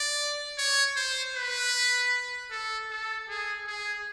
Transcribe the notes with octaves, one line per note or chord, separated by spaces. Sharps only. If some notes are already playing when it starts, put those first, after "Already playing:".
Already playing: D5
C#5
C5
B4
A4
A4
G#4
G#4